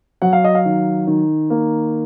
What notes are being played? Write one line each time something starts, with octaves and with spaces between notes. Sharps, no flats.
F#3 F#5
F5
D#5
F5
D#3
D#3
A#3